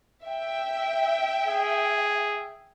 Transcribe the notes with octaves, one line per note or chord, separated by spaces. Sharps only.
E5 G5
G#4